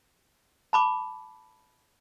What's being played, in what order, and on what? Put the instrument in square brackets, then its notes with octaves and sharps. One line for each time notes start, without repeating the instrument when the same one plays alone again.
[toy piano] A5 B5 D6